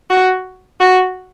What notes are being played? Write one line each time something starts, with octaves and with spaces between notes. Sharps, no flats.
F#4
F#4